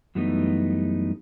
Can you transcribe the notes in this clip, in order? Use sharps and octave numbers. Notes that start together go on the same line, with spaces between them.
F#2 E3 G3 A3 B3 D#4